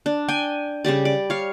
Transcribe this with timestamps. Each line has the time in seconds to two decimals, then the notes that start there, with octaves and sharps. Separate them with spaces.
0.06 D4
0.28 G5 G#5
0.85 C#3 G3 G4 D5
1.05 D5
1.30 C#5 F5